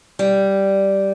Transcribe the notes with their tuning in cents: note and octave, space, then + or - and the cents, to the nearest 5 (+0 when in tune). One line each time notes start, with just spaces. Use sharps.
G3 -5